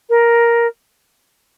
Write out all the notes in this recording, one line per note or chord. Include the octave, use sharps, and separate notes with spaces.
A#4